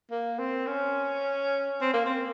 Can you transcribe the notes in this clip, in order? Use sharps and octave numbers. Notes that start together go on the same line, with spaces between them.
A#3
C4
C#4
C4
A#3
C4